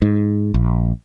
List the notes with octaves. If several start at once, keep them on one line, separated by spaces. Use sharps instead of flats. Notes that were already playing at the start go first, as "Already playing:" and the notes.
G#2
A#1